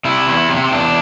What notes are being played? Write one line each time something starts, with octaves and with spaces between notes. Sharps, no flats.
C3 E4
E2
C3
C4
E2 D4